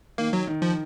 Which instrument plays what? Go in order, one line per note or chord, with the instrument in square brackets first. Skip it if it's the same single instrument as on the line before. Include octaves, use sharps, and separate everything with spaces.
[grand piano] D#3 [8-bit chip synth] A#3
[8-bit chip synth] F#3
[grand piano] D#3
[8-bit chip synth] F3